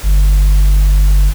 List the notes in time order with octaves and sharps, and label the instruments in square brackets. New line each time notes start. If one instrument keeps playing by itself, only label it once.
[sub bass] G1